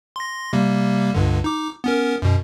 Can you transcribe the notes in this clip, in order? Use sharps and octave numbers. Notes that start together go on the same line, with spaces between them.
C6 A#6
C3 G3 A#3
C#2 G2 D3
D#4 D6
B3 C#4 A#4
F#2 B2